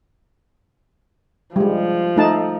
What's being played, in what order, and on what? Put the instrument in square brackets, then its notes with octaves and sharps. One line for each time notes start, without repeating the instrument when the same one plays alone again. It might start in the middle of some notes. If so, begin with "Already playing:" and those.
[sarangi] F3 [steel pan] G3 G#3
[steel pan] A3 D#4 A5